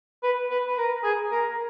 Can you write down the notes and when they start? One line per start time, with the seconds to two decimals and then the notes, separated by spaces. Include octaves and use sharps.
0.23 B4
0.50 B4
0.67 B4
0.77 A#4
1.04 G#4
1.31 A#4